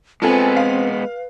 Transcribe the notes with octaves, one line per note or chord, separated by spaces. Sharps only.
G#3 B3 C4 F4 A4 B4 G#5
F5